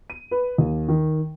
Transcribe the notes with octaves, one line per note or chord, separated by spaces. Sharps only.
D#7
B4
D#2
D#3